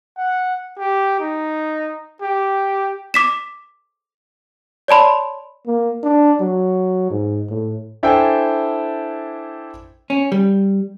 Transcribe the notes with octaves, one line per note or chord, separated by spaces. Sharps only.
F#5
G4
D#4
G4
D6 B6 E7
C#5 D5 A5 B5 C6
A#3
D4
F#3
G#2
A2
D4 E4 A4 C5 G5 G#5
C#4
G3